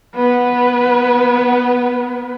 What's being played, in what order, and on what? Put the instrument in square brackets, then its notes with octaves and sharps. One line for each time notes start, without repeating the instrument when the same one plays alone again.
[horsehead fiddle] B3 B4